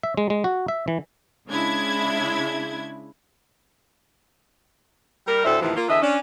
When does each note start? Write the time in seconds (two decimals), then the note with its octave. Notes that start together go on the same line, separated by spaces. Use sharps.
0.03 E5
0.17 G#3
0.30 G#3
0.44 F#4
0.68 E5
0.88 E3
1.49 C#3 G#3 D4 E4 G#6
5.27 G3 A#4
5.44 D2 A2 D4 A4 C5 E5
5.61 D#2 A2 C3 E3 F3
5.76 A#3 F4
5.88 E2 D3 E3 D#5 E5
6.01 C#4 D4